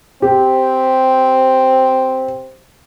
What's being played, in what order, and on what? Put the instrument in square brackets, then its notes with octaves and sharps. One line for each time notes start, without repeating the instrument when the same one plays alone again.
[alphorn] C4 [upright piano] G4